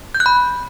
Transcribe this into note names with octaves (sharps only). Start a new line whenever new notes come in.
G6
F#6
B5